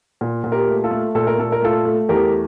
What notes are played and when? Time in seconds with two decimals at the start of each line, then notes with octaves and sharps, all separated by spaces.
0.21 A#2
0.44 A#2
0.52 G4 A#4
0.68 A3
0.84 F4 A4
0.91 A3
1.15 A#2 A4
1.27 A#4
1.38 A#2 A4
1.52 A#4
1.62 A3 F4 A4
1.85 A3
2.09 E2 G4 A#4